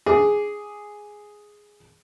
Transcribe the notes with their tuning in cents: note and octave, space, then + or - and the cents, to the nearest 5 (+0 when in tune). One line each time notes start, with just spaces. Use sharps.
G#4 +0 D6 +0